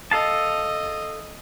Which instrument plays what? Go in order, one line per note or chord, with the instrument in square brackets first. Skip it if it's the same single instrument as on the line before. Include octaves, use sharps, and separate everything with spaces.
[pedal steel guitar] A4 F5 A5 [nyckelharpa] D#5